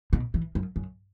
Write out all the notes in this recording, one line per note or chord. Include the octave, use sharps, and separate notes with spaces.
B2
E3
F#2
F#2